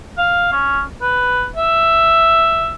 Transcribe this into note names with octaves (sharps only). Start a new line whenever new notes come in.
F5
C#4
B4
E5